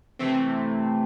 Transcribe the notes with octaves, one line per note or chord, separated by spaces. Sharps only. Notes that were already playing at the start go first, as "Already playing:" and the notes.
C3 E3 A3 C4